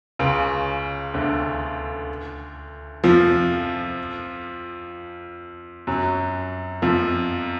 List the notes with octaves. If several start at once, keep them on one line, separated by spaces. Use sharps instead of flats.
C#2 C#3
D2 D3
F2 F3
F#2 F#3
F2 F3